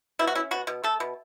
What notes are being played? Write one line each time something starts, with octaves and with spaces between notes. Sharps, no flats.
B2 E4
F#4
C#4 E4
B2 F#4
B2
A3 A4
B2